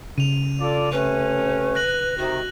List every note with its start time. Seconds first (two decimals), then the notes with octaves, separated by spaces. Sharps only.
0.18 C#3 D#7 F7
0.60 F4 A4 D5
0.92 C3 A3 C#4 B4
1.75 F#6 A#6 F#7
2.18 C3 D#3 F#4